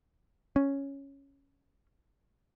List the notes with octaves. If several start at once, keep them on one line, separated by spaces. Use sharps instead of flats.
C#4